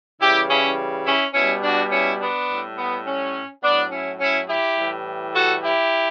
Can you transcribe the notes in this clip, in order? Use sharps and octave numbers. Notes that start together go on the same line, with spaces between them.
C#3 E3 G3 E4 G4
C#4 E4
C#4 E4
B2 G3 C#4 E4
D4 F#4
C#4 E4
B3 D4
A2 G3
B3
C#4
A2 F#3 B3 D4
C#4 E4
C#4 E4
E4 G4
A2 E3 G3
F#4 A4
E4 G4